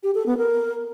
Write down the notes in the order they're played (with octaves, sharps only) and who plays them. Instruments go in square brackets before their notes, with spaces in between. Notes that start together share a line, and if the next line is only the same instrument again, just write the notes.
[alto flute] G4
A4
B3
A#4